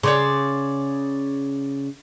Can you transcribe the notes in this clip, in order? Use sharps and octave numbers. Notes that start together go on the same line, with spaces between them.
C#3 C#5 D5 C6